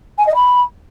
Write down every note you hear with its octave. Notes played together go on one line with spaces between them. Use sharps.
G#5
D#5
B5